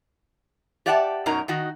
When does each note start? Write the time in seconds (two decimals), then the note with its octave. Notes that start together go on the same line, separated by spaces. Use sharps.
0.86 G4 D5 E5 F#5 G5 A5
1.26 F#2 B2 F#3 D#4 A#4 A#5
1.48 D#3 D#4 F#4